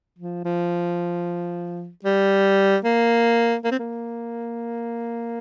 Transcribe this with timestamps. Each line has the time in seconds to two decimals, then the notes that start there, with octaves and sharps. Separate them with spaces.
0.18 F3
0.45 F3
2.04 G3
2.84 A#3
3.64 A#3
3.72 C4
3.79 A#3